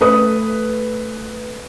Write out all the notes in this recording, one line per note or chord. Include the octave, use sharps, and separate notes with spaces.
A3 B4 D#6